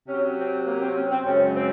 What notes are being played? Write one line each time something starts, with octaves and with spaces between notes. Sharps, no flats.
C3 F#3 C#4
C4
A#3
C4
C#4
C4
F#2 C#3 G#3 C#4
C4